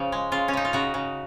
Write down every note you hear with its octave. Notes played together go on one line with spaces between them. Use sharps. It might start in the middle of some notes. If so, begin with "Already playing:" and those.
Already playing: C#3 F3
G#3
C#3 F4
C#4
C#3 D#4
F4
C#3 F#4
C#3